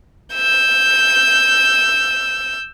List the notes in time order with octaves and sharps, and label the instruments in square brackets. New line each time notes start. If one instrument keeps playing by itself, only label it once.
[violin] E6 G6